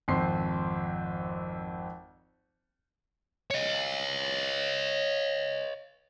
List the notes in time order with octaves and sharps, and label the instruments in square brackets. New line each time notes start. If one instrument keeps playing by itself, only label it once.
[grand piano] G#1 F2 C4 C6 C7
[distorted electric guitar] C#5 D#5